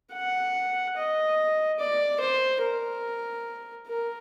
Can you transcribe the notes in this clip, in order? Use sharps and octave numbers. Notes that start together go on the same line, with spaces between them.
F#5
D#5
D5
C5
A#4
A#4